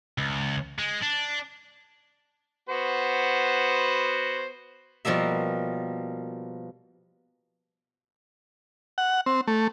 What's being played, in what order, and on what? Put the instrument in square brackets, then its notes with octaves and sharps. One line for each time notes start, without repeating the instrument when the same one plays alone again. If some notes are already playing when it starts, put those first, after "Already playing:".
[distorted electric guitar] C#2
G#3
D4
[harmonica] B3 F#4 C5
[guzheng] B2 F3 G3 A#3 E5
[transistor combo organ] F#5
C4
A3